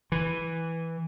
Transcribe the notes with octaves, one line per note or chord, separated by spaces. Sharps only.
E3